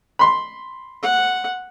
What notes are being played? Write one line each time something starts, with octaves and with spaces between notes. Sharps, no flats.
B5 C6
F#5